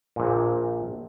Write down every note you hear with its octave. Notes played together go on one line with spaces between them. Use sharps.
A#1 A#2